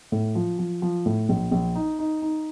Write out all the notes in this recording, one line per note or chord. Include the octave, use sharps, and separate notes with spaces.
A2
F3
F3
F3
A2
A#1
A#1
D#4
D#4
D#4